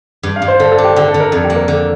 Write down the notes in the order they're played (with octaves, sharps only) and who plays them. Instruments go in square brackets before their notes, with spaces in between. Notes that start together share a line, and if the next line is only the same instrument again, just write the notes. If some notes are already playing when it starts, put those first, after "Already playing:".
[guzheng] G2
[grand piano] F5
[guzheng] G2
[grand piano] C5
[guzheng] D3 [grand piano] A4
[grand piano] A4
[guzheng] D4
[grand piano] G4
[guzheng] D3 [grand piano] G4
[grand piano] A4
[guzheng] D3
[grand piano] A#4
[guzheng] F2 [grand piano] A4
[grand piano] G4
[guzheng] A#3
[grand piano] A#4
[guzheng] D3